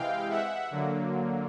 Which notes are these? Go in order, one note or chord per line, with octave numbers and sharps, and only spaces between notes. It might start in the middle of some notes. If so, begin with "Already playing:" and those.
Already playing: C3 E3 G#3 F5 G5
E5 F#5
D3 F#3 A#3